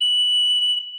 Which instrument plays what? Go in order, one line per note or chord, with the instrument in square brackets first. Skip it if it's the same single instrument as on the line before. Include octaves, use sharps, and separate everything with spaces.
[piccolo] F#7